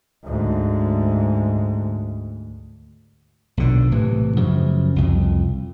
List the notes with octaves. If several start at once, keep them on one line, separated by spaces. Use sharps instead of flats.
D2 G#2
B1 A#2 D3
A2 C3 E3
F#2 C#3 F3
C2 F2